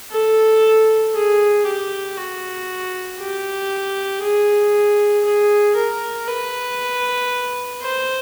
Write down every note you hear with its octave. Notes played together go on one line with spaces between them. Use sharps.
A4
G#4
G4
F#4
G4
G#4
G#4
A#4
B4
C5